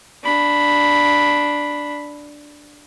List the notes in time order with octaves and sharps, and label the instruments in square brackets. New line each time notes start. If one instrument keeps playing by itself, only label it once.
[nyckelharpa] D4 B5